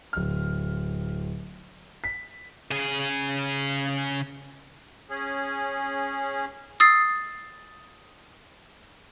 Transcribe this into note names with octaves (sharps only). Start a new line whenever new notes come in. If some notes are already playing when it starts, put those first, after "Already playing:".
D1 F6
B6
C#3 G#4
C#4 G#4
D#6 E6 A6 C7